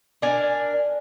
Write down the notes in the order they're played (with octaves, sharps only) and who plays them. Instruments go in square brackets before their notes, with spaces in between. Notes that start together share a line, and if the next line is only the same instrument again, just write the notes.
[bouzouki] D4 A#4 G#5